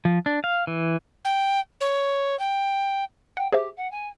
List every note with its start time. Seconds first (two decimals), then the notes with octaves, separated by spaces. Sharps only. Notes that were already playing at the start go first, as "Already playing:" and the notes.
0.05 F3
0.26 D4
0.44 F5
0.67 E3
1.25 G5
1.81 C#5
2.39 G5
3.37 F#5 G5
3.53 G4 G#4 C5 E5
3.77 F#5
3.91 G#5